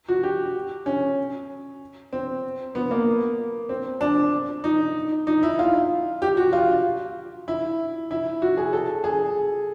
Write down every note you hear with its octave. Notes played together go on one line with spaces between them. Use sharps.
F#4
G4
C#4
C4
B3
A#3
C4
D4
D#4
D#4
E4
F4
G4
F#4
F4
E4
E4
F#4
G#4
A4
G#4